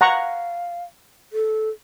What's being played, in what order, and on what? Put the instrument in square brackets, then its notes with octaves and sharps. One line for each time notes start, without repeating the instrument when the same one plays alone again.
[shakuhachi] F5 [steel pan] F#5 A#5 C#6
[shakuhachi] A4